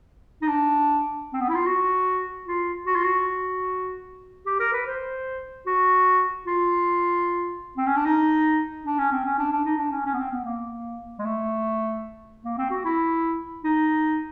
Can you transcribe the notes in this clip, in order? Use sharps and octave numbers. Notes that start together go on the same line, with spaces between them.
D#4
D4
C4
B3
E4
F4
F#4
F4
F#4
F4
F#4
G4
A#4
B4
C5
F#4
F4
C4
C#4
D4
D#4
D4
C#4
C4
C#4
D4
D4
D#4
D4
C#4
C#4
B3
C4
B3
A#3
G#3
A3
A#3
C4
F#4
E4
D#4